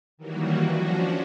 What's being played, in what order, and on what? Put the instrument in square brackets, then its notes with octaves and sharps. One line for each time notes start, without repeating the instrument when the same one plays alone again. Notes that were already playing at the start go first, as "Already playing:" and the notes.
[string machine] D#3 E3 F#3 G3 A#3 F#4
F3 C#4 D4 F#4